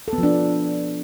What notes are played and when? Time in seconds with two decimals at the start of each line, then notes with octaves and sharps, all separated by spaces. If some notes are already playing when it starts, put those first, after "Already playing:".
0.08 A4
0.13 B3
0.18 F3
0.23 D4